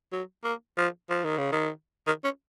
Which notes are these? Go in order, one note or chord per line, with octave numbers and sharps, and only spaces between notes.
F#3
A#3
F3
F3
D#3
C#3
D#3
D#3
C#4